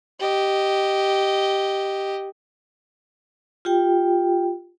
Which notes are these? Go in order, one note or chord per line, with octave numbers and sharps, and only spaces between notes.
G4 D#5
F4 G4 G5